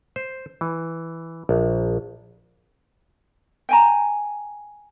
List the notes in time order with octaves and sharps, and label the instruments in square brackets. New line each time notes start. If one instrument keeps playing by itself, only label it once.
[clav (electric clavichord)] C5
E3
A#1
[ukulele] G5 G#5 A#5